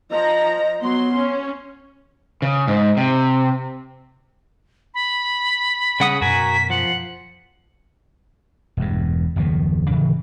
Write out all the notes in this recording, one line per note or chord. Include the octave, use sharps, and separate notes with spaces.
F3 D#5 A#5
F#3 B3 C6
C#4
C#3
G#2
C3
B5
C#3 G3 F#5 D#6
F#2 B2 F#4 A#4 G#5 B6
F3 F#5
E1 E2 G2
F#1 D#2 B2 F3
D1 C#3 E3